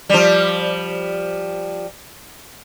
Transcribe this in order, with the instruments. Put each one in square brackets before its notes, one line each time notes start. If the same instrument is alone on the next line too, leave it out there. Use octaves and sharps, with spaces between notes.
[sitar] F3 G3